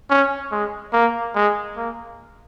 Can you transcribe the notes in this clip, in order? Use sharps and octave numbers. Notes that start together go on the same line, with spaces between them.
C#4
G#3
A#3
G#3
A#3